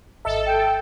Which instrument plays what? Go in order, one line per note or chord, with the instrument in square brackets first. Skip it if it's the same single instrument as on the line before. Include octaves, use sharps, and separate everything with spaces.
[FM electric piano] G#1 D#5 E5 [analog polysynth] A4
[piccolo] G5